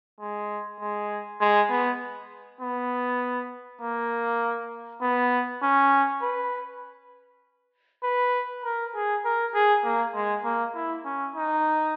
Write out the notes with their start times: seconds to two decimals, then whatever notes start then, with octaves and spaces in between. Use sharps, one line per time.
0.20 G#3
0.80 G#3
1.40 G#3
1.70 B3
2.61 B3
3.81 A#3
5.02 B3
5.63 C#4
6.22 B4
8.03 B4
8.64 A#4
8.95 G#4
9.25 A#4
9.54 G#4
9.84 A#3
10.15 G#3
10.44 A#3
10.75 E4
11.05 C#4
11.36 D#4